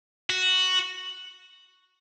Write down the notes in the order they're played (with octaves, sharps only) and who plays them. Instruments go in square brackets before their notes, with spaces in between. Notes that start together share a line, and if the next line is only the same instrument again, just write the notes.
[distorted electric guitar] F#4